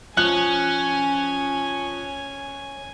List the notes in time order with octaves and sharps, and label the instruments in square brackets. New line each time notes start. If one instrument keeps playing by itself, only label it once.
[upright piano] F3 F#6 F#7 [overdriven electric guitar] C#4 [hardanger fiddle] G#5